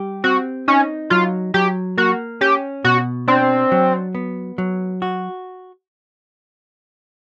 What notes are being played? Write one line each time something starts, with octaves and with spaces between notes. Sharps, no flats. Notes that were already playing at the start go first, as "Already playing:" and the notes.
Already playing: G3 G4
C4 F#4
C#4 D#4
F#3 F4
F#3 G4
A#3 F#4
C#4 G4
B2 F#4
C4 D4
F#3
B3
F#3
F#4